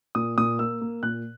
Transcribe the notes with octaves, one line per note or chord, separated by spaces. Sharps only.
A#2 D#6
A#2 D#6
A#3 E6
A#3
A#2 F#6